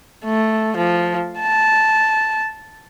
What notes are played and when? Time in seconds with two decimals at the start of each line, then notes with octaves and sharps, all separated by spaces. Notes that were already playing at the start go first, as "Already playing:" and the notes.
0.25 A3
0.77 F3
1.41 A5